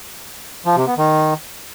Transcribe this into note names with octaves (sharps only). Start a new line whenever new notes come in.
F3
C3
B3
D#3